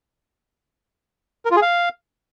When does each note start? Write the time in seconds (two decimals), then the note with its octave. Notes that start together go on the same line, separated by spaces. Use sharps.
1.45 A#4
1.51 F4
1.56 G#4
1.62 F5